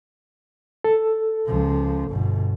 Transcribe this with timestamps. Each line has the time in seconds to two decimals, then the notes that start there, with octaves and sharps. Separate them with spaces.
0.84 A4
1.46 C#2 F3
2.10 G1 B2